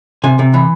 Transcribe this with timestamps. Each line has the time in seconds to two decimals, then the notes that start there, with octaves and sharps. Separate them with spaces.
0.24 C3 G#5
0.39 C3
0.54 E3